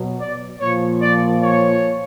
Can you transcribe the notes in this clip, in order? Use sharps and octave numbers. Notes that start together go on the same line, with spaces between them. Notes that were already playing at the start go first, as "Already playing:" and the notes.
Already playing: B2 F#3
D5
A#2 F3 C#5
D5
C#5